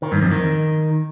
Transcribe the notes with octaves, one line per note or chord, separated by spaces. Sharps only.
D#3
G2
F2
D#3